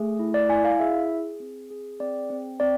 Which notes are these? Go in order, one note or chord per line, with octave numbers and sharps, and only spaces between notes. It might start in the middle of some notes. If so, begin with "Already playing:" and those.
Already playing: A3 G#4
E4
D5
E4 G#5
F5
G#4 E5
G#4
C4
G#4
C4 D5
C4
C4 D5